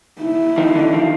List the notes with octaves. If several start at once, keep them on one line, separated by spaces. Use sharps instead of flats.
E4
D#3 F3
D3 E3
D#3 F3